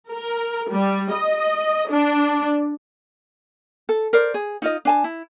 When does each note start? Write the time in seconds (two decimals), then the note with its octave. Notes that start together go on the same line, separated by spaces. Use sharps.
0.11 A#4
0.70 G3
1.13 D#5
1.90 D4
3.89 A4
4.13 A#4 C5 D5
4.34 G#4
4.62 D#4 F4 D#5
4.85 D4 G#5 A5
5.04 E4